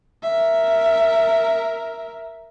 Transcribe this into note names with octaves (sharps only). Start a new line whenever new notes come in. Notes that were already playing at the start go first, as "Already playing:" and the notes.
A#4 E5